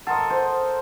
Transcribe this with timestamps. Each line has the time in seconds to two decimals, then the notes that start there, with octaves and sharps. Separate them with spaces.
0.07 A4 A#4 D#5 F#5 C6
0.30 C5